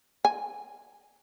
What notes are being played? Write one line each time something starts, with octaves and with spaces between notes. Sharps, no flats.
G#5